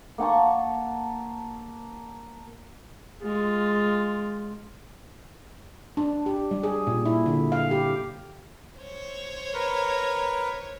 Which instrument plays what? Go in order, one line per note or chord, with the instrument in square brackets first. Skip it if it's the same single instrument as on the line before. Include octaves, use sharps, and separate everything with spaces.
[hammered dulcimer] A#3 F#5 A5 C#6
[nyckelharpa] G#3 F4
[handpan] D4
G4
G3
G#4
A#2
E4
D3
F5
G4
[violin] C5 C#5
[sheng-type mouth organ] A#4 B4